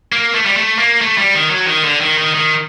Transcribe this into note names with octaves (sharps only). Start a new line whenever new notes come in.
A#3
A3
G3
A3
A#3
A3
G3
D#3
F#3
D#3
D3
D#3
D#3
D#3